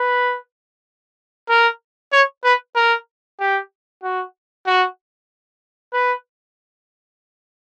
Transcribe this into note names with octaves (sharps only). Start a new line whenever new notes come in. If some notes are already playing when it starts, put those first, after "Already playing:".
Already playing: B4
A#4
C#5
B4
A#4
G4
F#4
F#4
B4